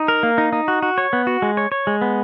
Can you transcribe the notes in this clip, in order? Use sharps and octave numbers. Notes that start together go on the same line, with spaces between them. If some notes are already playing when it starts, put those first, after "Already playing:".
Already playing: D#4
A#4
A#3
D#4
D#4
F#4
F#4
C#5
B3
F#4
G#3
C#5
C#5
G#3
B3